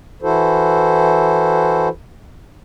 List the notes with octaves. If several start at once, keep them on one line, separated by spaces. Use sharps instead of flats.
E3 E4 F#4 A4 C5